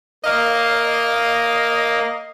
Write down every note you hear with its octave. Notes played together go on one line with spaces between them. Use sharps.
A#3 D#5 F5